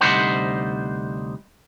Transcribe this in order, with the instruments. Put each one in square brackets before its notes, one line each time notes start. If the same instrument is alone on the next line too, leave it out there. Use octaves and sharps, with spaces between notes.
[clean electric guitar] D2 C3 G3 D#4 C5 F#5